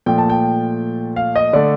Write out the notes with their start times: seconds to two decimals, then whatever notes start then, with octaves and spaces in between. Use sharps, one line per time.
0.06 A#2 F3 A3 G5
0.18 A5
0.30 G5
1.16 F5
1.36 D#5
1.53 D3 A3 D5